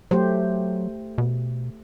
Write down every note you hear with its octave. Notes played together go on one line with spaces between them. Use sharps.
F#3 A3 G4 C5
B2